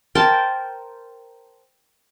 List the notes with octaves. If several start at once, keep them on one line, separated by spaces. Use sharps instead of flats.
A#4 C5 G5 A5